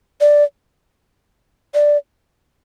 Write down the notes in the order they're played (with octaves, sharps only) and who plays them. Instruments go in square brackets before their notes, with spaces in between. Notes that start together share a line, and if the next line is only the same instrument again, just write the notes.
[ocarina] D5
D5